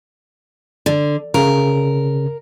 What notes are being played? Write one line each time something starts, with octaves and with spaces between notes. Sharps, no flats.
D3
C#3 A#4